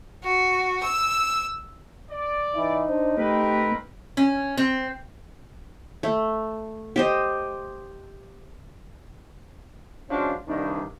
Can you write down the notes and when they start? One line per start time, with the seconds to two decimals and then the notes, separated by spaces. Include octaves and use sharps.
0.23 F#4
0.82 E6
2.09 D5
2.55 E3 D#4
2.89 D4 C5
3.17 A3 C4 G4 A#4 B4
4.17 C#4
4.57 C4
6.03 A3
6.96 G4 C5 D#5
10.10 F3 G#3 C#4 D4 F4 F#4
10.48 C2 G2 D#3 G3 D4 D#4